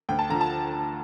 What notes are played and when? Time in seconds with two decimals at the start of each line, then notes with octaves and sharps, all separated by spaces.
0.09 D2 G5
0.19 A5
0.30 D3 F3 A#5
0.41 A5